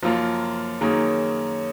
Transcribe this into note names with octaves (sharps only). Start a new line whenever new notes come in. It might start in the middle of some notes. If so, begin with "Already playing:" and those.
F#2 F3 A#3 F4
F#2 D#3 A#3 C#4 G#4